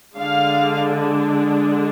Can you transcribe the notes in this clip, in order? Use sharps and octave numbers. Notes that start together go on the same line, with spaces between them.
D3 G#3 D4 F5